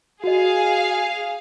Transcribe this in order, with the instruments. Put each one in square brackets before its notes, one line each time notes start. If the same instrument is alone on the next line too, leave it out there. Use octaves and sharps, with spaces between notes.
[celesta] F#4 D#5 [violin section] G#4 F5